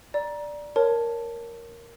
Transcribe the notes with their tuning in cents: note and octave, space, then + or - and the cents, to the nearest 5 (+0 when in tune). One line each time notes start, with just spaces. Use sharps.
D5 +0 A#5 +20
A#4 +0 C#5 -10 A5 +0